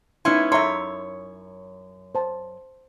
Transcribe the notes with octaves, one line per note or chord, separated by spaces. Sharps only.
B3 C#4 D#4 E4 C6
F#2 C#5 E5 A#5 C6
C5 A5